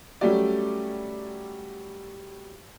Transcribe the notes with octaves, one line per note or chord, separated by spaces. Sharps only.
F#3 G3 A3 C#4 G4 D5